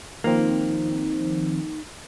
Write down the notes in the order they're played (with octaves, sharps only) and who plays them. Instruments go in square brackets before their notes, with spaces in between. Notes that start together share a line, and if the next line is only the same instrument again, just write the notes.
[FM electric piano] D#3 F3 C4 [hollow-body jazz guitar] A#3 [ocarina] D#4